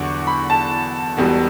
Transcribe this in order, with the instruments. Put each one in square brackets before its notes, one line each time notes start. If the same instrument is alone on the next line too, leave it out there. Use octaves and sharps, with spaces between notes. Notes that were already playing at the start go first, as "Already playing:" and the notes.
Already playing: [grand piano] E2 D3 F#3 C#6 D6
B5
A5
E1 E2 B2 G3